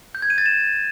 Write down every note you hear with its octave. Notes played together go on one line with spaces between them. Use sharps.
G6
G#6
D#7
A6
E7